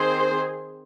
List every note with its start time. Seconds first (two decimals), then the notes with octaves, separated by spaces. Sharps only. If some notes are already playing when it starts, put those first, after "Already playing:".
Already playing: D#3 C4 G#4 C5